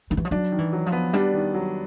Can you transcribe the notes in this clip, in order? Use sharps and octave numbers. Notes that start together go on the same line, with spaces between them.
D#3
E3
F3
F#3 D4
D#3
E3
F#3
F3
B3
G3 D4
D#3
F#3